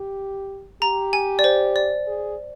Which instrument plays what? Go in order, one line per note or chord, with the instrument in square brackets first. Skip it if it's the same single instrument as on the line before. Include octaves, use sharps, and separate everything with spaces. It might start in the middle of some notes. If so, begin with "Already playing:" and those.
Already playing: [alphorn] G4
[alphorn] G4 [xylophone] A#5
[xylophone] G#5
D5
C5
D5
[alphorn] G#4